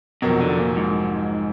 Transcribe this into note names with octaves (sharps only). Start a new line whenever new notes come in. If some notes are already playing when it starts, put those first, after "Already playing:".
F1 F2 B2 D#3 F#3
D3
A#2
G#2